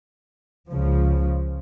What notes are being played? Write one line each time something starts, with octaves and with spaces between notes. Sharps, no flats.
C#2 C#3 F3